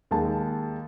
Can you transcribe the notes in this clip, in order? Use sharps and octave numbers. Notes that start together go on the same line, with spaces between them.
D#2 G#3 A5